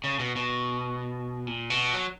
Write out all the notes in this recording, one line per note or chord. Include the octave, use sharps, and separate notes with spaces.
C#3
B2
B2
A#2
B2
F#3